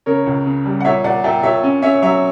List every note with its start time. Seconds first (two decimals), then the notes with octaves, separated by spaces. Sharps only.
0.06 C#3 A#4 C#5
0.26 C#2
0.46 C#3
0.65 G3
0.80 F#5
0.85 A#2 C#5 E5
1.04 A#2 D5 F#5
1.24 A#2 E5 G5
1.43 A#2 C#5 E5
1.63 C#4
1.82 C#4 C#5 E5
2.02 F#3 C#5 E5